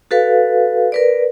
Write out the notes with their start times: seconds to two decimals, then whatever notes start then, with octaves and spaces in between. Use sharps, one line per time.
0.11 F#4 A4 B4 F5
0.92 A#4 B4 D5